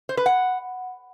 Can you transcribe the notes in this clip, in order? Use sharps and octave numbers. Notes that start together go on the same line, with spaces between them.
C5
B4
F#5